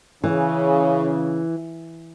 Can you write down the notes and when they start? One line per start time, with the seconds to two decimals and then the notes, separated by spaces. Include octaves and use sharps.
0.24 C#3 E3